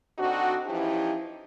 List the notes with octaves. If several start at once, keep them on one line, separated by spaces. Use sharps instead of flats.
D3 C4 D4 D#4 F#4
E3 F3 C#4 D#4 E4 G4